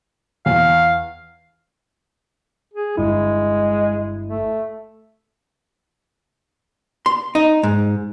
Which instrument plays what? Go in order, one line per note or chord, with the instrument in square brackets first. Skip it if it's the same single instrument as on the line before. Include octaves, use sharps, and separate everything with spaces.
[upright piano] E2 [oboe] F5
[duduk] G#4
[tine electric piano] G1 G2 E4 [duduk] G#3
[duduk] A3
[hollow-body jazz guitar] C6
D#4
G#2